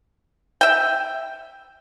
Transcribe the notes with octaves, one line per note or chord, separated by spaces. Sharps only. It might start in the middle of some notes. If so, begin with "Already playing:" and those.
E5 G5